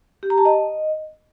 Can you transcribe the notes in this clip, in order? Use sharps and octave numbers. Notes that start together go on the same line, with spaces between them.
G4
A#5
A5
D#5